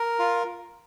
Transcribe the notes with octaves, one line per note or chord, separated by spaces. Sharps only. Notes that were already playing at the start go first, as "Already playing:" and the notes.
Already playing: A#4
F4